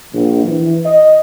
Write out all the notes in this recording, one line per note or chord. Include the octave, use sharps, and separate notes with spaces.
A#1
E3
D#5